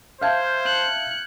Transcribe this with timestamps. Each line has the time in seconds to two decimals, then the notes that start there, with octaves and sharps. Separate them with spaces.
0.21 C5 E5 F5 A5 F6 G6 G#6
0.65 F#6 C#7